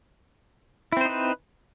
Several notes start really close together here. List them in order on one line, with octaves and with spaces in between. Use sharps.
E4 C4 C5 D#4 B4